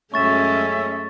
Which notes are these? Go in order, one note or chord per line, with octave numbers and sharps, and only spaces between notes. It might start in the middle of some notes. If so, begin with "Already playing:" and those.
F#2 G#3 A3 C#4 E5 C#6 A6 E7